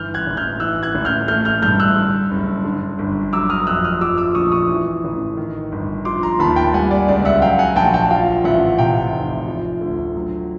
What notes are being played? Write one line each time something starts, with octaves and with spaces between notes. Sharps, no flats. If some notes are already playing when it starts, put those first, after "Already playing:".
Already playing: G1 E3 F6 G6
F#6 G#6
A1
F6 G6
E3 E6 F#6
F#6 G#6
A1
F6 G6
A3 F6 G6
F6 G6
G2 F6 G6
E6 F#6
D3
F#1
D3
G1
F#3 D6 E6
D#6 F6
F2 E6 F#6
D#6 F6
F3 D6 E6
D6 E6
A#1 C#6 D#6
C#6 D#6
E3
A1
D#3
G1
F3 C6 D6
A#5 C6
D#2 A5 B5
G5 A5
G3 F#5 G#5
D5
C#2 D5
E5 F#5
F#3 F5 G5
F#5 G#5
A#1 G5 A5
G5 A5
F3 F5 G5
A1 E5 F#5
C3 F5 G5
F1
F3
D2
F#3